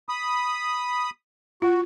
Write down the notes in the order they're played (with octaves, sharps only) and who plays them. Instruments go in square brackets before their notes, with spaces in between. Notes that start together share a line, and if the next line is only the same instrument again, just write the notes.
[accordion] B5 D#6
[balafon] F4 [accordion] F#4